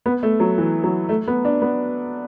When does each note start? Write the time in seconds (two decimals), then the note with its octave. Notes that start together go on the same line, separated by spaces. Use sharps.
0.06 B3
0.23 A3
0.40 F#3
0.58 E3
0.84 F#3
1.09 A3
1.27 B3
1.45 D4
1.62 B3